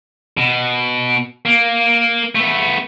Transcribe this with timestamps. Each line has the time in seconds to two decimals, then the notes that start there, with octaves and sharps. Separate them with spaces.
0.37 B2
1.45 A#3
2.35 A3 B3